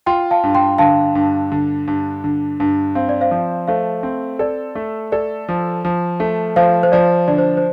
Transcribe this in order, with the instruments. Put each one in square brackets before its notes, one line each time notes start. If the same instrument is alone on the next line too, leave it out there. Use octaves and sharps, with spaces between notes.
[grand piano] F4 [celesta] G5 C6
[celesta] F5 A5
[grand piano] G2
[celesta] G5 C6
[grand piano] D3 [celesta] F5 A5
[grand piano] G2
D3
G2
D3
G2
[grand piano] C4 [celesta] F5
[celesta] D5
C5 F5
[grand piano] F3
[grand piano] A3 [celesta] C5 F5
[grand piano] C4
[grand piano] A4 [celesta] D5
[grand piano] A3
[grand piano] A4 [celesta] D5
[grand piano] F3
F3
A3
[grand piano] F3 [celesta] C5 F5
[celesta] C5
[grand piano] F3 [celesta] D5
[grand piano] D3 [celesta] D5
[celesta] C5
C5